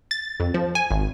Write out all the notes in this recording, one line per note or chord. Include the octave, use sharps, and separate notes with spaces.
A6
F2
F3
G#5
G#1